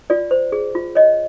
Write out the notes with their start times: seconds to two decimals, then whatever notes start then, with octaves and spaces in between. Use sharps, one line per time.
0.10 F4 D5
0.31 C5
0.52 G#4
0.75 F4
0.95 C#5 D#5